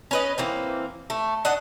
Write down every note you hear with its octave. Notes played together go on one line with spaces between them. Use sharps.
C#4 B4 D#5
E3 A#3 C4
A3
D4 D#5 F#5